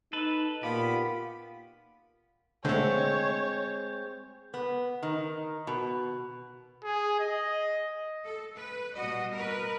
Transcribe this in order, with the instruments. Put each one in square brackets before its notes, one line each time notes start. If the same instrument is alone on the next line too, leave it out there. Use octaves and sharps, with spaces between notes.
[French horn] D#4 [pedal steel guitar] A4 B4
[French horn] A#2 [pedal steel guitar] B3 G4 [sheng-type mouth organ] F4 B5
[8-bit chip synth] D3 A3 [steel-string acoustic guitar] G#3 C4 [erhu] C#5 [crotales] G6
[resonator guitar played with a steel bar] B3
D#3
B2
[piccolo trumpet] G#4
D#5
[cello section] A4
B4
B2 G3 F#4 D#5
A#4 B4